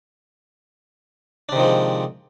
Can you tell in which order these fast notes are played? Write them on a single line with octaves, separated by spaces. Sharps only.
D4 C3 D#3 F3 G#3